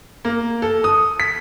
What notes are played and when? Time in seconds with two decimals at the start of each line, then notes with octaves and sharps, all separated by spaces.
0.25 A#3
0.62 A4
0.84 D#6
1.20 B6